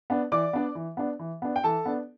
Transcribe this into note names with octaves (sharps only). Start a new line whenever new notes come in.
B3 D4
E3 D5 D6
B3 D4
E3
B3 D4
E3
B3 D4
G5
E3 A4 A5
B3 D4